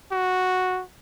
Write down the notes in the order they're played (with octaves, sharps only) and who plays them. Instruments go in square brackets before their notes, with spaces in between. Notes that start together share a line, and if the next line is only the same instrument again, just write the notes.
[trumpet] F#4